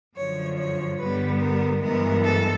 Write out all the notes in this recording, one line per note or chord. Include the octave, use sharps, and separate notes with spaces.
F#2 D3 F3 C#5
C#5
G2 D3 G3 B3 B4
A#4
G2 E3 G#3 B3 A#4
A4